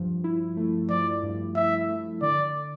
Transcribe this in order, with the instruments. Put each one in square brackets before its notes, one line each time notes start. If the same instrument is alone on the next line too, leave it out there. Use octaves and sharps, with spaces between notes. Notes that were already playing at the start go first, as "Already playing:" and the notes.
Already playing: [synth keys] G2 F3
E4
A3
[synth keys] F3 [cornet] D5
[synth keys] G2
[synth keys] E4 [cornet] E5
[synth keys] A3
[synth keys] D3 [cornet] D5